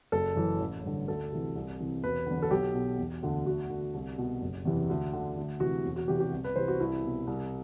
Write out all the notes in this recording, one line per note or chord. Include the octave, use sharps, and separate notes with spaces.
F#1 A4
F#2 E3
A1
G2 D3
D2 A4
C3 E3
C2
C3 E3
E1 B4
E2 D3
A4
B1 G4
B2
E1
D2 D3
D2 F#4
D3
C2
B2
F#1
E2 C3 E3
D2
D3
D2
C3 E3 F#4
E1
F#4
E2 C3 E3 G4
G4
C2
B4
C3 E3 C5
F#4
C2 E4
B2
C2